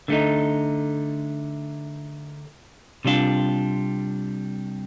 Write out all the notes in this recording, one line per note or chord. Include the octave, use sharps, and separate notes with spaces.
D3 A3 D#4
C3 G3 D4 F4